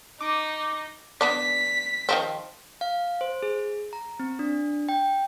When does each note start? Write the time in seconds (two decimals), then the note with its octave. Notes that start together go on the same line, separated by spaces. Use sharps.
0.21 D#4 D6
1.21 B3 D4 D5 B6
2.09 D#3 F3 C4
2.81 F5
3.21 C5
3.43 G#4
3.93 A#5
4.20 C4
4.39 D4
4.89 G5